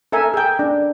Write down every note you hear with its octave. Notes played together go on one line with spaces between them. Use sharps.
A4 A#4 E5 G#5
G#4 G5
D4